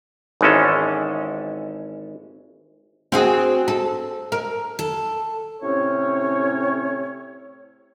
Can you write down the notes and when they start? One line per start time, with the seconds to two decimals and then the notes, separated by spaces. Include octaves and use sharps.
0.41 G#1 E3 G#3 C#4 A4
3.12 C4 F#4 G#4
3.68 A4
4.32 A#4
4.79 A4
5.63 A2 C3 C4 C#4 C#5